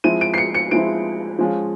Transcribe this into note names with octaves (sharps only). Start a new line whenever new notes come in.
F3 G#3 C4 E4 D#7
D7
C7
C#7
C#7
F3 G#3 C4 E4 D7
F3 G#3 C#4 F4